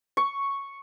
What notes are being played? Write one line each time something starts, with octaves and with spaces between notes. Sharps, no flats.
C#6